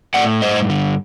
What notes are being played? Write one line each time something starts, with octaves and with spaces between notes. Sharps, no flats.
A2 D5 F#5
G2 C5 D#5
D3